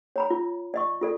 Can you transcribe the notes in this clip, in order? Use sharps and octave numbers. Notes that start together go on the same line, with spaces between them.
C#5 A#5 B5
F4
D5 D#5 C#6
F4 A4 D5